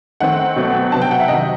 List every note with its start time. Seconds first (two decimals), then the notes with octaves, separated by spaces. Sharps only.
0.20 D#3 A3 C4 F#5
0.56 B2 F#3 A3 C4
0.92 C3 F#3 B3 A5
1.02 G5
1.11 F#5
1.20 E5
1.28 C3 D#3 F#3 D#5